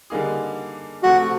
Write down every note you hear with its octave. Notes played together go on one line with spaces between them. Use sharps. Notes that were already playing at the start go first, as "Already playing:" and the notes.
D3 G3 A#3 D#4 G#4
C3 F3 A3 F#4